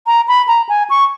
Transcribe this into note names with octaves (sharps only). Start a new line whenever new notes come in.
A#5
B5
A#5
G#5
C#6